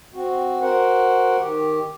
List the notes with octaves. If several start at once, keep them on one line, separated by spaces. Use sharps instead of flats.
C4 F#4
F#4 A#4 C5 F#5
D#3 G4